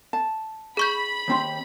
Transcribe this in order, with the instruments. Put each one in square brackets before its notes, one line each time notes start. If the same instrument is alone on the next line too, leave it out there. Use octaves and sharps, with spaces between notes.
[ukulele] A5
[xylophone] G#4 C#6 G6 [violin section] B5
[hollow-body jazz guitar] D#2 C4 C6